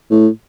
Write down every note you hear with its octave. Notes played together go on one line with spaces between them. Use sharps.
A2